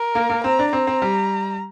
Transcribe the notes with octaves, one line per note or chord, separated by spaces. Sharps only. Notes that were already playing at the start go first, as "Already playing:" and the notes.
Already playing: A#4
A#3
A#3
C4 A#5
D4
C4 A#5
C4
G3